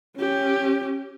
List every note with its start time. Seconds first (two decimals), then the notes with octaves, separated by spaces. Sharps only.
0.17 C#4 G4